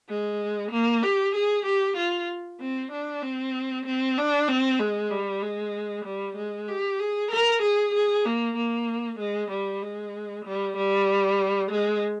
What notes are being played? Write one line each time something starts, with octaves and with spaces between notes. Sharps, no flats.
G#3
A#3
G4
G#4
G4
F4
C4
D4
C4
C4
D4
C4
G#3
G3
G#3
G3
G#3
G4
G#4
A#4
G#4
G#4
A#3
A#3
G#3
G3
G#3
G3
G3
G#3